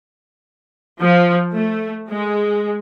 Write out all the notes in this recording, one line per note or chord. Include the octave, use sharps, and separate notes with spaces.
F3
A3
G#3